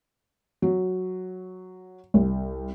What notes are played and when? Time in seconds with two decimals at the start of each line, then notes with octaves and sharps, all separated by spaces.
0.62 F#3
2.14 C2